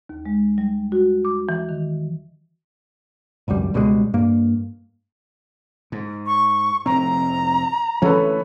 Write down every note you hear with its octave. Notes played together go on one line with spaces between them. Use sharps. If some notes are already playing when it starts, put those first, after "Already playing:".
D#2
G#3
G3
F#4
D6
E3
D#3
G#1 C#2 F#2 G3
C#2 B2 G3 G#3
G2 A#3
G#2
C#6
F1 A2 C4 A#5
D2 E3 A3 C#4 A4 B4